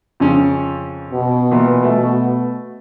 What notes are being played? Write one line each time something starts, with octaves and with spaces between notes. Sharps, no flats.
F2 C#3 C#4
B2
A#2 E3
A3